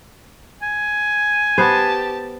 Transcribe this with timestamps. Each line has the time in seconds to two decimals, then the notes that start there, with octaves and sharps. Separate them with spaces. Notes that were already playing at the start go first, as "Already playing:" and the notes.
0.63 G#5
1.58 B3 G4 C5 A5